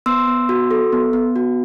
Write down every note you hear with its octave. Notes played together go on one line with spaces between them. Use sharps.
B3 C6 E6
B3
F#4
A4
B3
B3
F#4